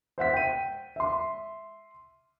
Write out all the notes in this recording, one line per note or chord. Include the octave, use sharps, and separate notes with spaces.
C5 E5 F#5 B6
G5 D#7
E5 C6